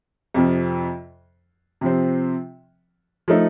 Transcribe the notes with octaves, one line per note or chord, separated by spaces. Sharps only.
F2 C3 F3
C3 F3 C4
F3 A3 D#4